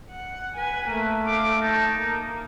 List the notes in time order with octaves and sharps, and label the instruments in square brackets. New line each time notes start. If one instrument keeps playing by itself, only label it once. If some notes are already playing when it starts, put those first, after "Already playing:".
[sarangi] F#5
[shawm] B4 [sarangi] G#5
[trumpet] A3 [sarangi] A#3
[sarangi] F5 [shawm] D6
[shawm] D#4 [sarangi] A5
[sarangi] A#3